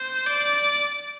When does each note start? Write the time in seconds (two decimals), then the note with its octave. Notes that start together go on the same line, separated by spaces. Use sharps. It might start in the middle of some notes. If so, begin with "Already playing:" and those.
Already playing: C5
0.27 D5